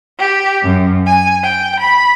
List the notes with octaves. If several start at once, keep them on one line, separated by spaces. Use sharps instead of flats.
G4
F#2
G#5
G5
B5